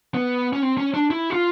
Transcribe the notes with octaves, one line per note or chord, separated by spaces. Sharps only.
B3
C#4
C4
C#4
D4
E4
F#4
F4